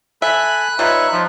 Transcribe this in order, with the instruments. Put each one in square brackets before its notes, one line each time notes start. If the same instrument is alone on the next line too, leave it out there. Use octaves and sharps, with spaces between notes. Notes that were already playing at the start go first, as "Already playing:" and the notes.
[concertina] A4 G#5 [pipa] E5 [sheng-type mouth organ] B5 F#6
[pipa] G3 F4 [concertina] D#4 B4 C#5 [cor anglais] E5
[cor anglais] F3 [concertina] D#4